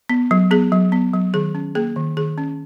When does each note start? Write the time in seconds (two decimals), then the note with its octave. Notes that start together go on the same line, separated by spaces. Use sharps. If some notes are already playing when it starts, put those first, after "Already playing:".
0.09 B3
0.31 F#3
0.51 B3 G#4
0.72 F#3
0.92 B3
1.14 F#3
1.34 D#3 G#4
1.55 C#4
1.75 A#3 G#4
1.96 D#3
2.17 D#3 G#4
2.38 C#4